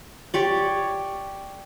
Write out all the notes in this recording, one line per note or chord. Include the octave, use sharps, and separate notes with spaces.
G4 C#5 D5